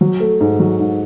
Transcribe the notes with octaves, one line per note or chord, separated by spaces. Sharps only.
F#3
A3
G#2
F#3
G#2